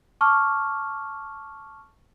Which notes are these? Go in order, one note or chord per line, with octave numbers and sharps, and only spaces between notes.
A5 C#6 D6 F6